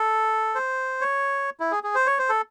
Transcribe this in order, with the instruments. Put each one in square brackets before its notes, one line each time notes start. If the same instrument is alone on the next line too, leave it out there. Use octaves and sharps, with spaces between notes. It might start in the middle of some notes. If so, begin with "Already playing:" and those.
Already playing: [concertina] A4
C5
C#5
E4
G#4
G#4
C5
C#5
C5
A4